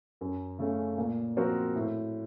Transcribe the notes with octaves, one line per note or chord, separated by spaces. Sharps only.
F#2
C#3 A3 C#4
A#2
F3 C4 F#4 A#4
A2